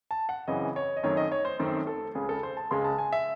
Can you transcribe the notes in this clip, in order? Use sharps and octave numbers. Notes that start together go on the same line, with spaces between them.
A5
F#5
F#2 C#3 E3 C4 D#5
C#5
D#5
F#2 D#3 A3 C4 C#5
D#5
C#5
C5
F#2 D#3 A3 C4 C5
A4
C#2 C#3 G#3 G#4
A4
C5
A5
C#2 C#3 G#3 C6
A5
G#5
E5